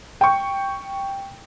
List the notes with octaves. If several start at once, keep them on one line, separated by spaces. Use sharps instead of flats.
G5 C#6